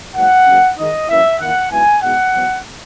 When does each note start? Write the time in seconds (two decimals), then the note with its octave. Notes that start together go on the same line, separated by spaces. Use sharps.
0.15 G#2 D#3 F#3 A#3 F#5
0.46 C#3 F#3 A#3
0.78 D#3 G#3 D#4 D#5
1.08 F#2 E3 A#3 C#4 E4 E5
1.39 D#3 A#3 E4 F#5
1.71 G#2 F#3 B3 E4 G#5
2.02 B2 G#3 D#4 F#5
2.33 E2 B2 F#3 B3